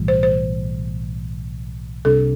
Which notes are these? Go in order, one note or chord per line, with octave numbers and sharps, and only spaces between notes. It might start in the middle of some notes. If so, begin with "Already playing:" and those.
Already playing: B1 A2 E3 G3
C5
C5
C2 C3 G3 D4 A4